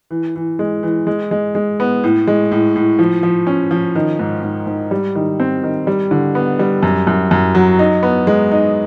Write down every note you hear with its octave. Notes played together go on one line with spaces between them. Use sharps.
E3
E3
G#3
E3
G#3
G#3
G#3
B3
A2
G#3
A2
A2
F3
F3
C#4
F3
D#3
G#2
G#2
G#2
G3
D#3
C4
D#3
G3
D3
B3
G3
F#2
F#2
F#2
F#3
D#4
B3
G#3
D#4